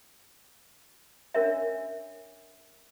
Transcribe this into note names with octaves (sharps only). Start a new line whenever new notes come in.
C#4 D4 A#4 C#5 E5